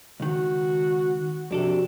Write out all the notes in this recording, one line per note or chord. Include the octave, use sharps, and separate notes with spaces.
C#2 D#3 F#4
F2 C3 D4 F#4 A4